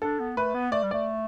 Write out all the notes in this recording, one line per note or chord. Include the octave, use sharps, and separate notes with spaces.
D4 A4
B3
A3 B4
B3
A3 D5
G3
A3 D5